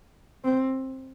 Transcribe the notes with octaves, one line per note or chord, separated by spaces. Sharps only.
C4